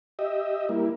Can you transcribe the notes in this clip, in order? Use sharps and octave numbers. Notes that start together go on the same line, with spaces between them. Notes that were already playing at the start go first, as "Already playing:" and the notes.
G4 D#5 E5
G3 A#3 E4